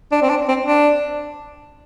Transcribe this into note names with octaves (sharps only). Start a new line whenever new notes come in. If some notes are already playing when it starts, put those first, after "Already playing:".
D4
C4
D4
C4
D4